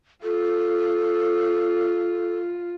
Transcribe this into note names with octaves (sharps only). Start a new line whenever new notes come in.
F4 A4